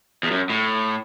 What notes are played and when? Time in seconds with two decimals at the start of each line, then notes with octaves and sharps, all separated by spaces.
0.23 E2
0.31 F#2
0.50 A2